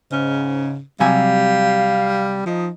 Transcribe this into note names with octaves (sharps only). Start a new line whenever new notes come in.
G#2 C#3
C3 F#3 G3 F5 G#5
F3 D#4 D#6